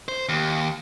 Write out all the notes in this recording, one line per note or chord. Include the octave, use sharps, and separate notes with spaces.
C5
D#2